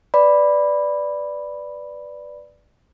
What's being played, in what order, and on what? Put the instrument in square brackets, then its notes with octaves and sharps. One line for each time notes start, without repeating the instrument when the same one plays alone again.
[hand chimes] B4 D5 B5